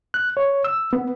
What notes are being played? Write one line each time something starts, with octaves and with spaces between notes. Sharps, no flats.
F#6
C#5
E6
B3